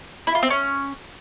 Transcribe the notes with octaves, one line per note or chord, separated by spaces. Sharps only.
E4
F4
C4
C#4